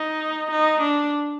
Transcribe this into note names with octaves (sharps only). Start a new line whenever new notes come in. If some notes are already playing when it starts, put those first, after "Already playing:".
Already playing: D#4
D#4
D4